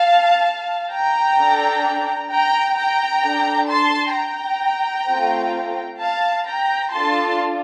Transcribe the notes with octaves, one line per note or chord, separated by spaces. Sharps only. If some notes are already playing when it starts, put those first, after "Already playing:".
Already playing: F5 A5
G5 A#5
D4 A4
G5 A#5
G5 A#5
D4 A4
A5 C6
G5 A#5
A3 C4 F4
F5 A5
G5 A#5
D4 F4 A4 A5 C6